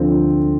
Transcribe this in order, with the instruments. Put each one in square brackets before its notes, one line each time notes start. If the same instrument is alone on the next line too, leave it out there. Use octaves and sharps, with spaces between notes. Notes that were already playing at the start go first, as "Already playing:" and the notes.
Already playing: [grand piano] D2 D3 F3 C4